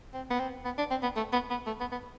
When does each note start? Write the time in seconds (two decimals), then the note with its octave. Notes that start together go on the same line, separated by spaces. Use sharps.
0.14 C4
0.31 B3
0.40 C4
0.65 B3
0.78 D4
0.91 C4
1.03 B3
1.17 A3
1.33 B3
1.50 B3
1.67 A3
1.80 B3
1.92 B3